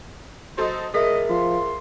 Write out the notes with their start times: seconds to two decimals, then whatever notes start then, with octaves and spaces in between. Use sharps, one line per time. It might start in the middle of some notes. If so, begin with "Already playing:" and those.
0.58 F#3 A4 C5 D#5
0.94 F1 G#4 A#4 D#5 E5 B6
1.30 F3 C6